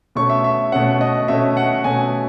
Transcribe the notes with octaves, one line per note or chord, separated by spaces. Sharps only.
B2 A3 C#4 C#6
E5
E5
B2 A3 C#4 F#5
D#5
B2 A3 C#4 E5
F#5
B2 A3 C#4 G#5